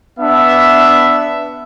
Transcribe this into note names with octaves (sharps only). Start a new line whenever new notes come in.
B3 D4 E5